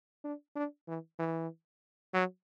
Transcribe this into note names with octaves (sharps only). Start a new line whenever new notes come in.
D4
D4
E3
E3
F#3